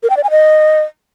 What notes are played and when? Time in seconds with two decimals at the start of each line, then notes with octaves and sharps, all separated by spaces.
0.03 A#4
0.10 G5
0.17 D5
0.24 G#5
0.30 D#5